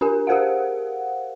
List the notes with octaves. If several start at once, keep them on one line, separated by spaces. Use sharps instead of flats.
D4 G4 A#4 G#5
G4 G#4 A#4 C5 F5 F#5